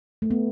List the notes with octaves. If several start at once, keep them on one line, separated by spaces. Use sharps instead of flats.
A3
B3